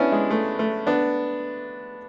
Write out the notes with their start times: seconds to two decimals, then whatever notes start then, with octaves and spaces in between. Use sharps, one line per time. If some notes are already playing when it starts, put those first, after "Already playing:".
Already playing: B3 C#4 D4 E4
0.12 G#3
0.30 A3
0.59 A3
0.87 B3 D4